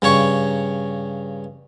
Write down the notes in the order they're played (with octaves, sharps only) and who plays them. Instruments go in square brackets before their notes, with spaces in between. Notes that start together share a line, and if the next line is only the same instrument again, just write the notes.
[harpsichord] G2 C#3 C#5 C#6